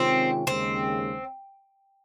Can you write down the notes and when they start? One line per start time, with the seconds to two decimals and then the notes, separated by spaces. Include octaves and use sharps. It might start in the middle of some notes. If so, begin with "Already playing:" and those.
Already playing: C3 D#3 G#3 C4 C#4 F4
0.46 D#2 C#3 G#3 C4